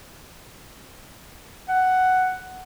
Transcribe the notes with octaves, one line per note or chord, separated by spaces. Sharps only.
F#5